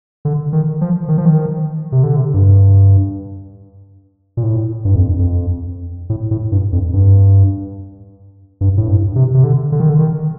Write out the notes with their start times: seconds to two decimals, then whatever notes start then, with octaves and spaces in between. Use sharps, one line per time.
0.25 D3
0.53 D#3
0.81 F3
1.08 D#3
1.18 F3
1.26 D#3
1.92 C3
2.03 D3
2.16 C3
2.34 G2
4.37 A#2
4.43 A2
4.85 G2
4.96 F2
5.19 F2
6.10 A2
6.31 A2
6.52 G2
6.73 F2
6.93 G2
8.61 G2
8.78 A2
8.88 G2
9.16 C3
9.34 C3
9.44 D3
9.72 D3
9.80 D#3
9.89 D3
9.99 D#3